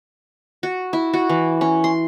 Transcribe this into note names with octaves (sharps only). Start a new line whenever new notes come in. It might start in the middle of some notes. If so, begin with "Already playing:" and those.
F#4
E4
F#4
E3
C#4
C6